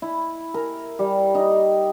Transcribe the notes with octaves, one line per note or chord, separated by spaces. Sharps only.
E4
A#4
G3
D#4